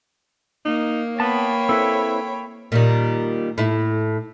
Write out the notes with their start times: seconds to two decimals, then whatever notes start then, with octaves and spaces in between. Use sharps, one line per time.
0.65 A#3 D#4
1.20 B3 C#5 G5 A5 B5
1.69 C4 E4 A4 B4
2.72 A#2 D#3 G3
3.58 A2 E4